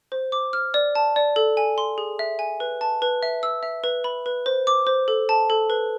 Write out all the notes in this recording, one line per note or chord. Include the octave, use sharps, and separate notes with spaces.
C5
D6
F6
D5
A5
D5
A4
G#5
C6
G#4
E5
G#5
B4
A5
B4
E5
E6
E5
B4
B5
B4
C5
D6
C5
A4
A5
A4
B4